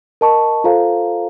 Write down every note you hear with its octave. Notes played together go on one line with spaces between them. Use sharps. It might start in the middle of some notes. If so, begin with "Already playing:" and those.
A#4 D#5 A5 C#6
F4 A4 C5 F5 A#5